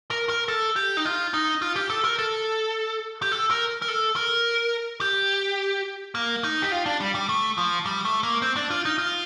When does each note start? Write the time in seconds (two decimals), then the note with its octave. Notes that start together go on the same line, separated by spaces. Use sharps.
0.11 A#4
0.29 A#4
0.48 A4
0.76 G4
0.97 D#4
1.05 F4
1.34 D#4
1.62 F4
1.76 G4
1.90 A4
2.04 A#4
2.19 A4
3.22 G4
3.32 A4
3.51 A#4
3.82 A#4
3.88 A4
4.16 A#4
5.01 G4
6.15 A#3
6.44 D#4
6.62 G4
6.72 F4
6.86 D4
7.00 G3
7.15 G3
7.29 A3
7.58 F3
7.86 G3
8.05 A3
8.23 A#3
8.42 C4
8.56 D4
8.70 F4
8.85 D#4
8.98 F4